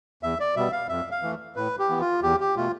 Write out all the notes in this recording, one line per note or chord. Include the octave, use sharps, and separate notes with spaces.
E2 E5
D5
B2 G3 B3 E5
F5
F2 E5
F5
E3 A3
A2 B4
G4
E3 B3
F4
E2 G4
G4
B2 A3 F4